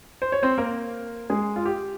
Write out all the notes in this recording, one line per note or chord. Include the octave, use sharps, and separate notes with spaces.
C5
C#5
C4 C5
A#3 A#4
G#3 G#4
F4
G4